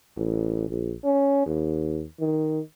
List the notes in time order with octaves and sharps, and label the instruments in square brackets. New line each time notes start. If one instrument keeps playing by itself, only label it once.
[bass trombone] A1
A#1
C#4
D#2
D#3